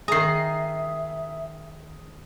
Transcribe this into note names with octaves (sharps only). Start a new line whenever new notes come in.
D#3 G#4 E5 A#5 D#6 C7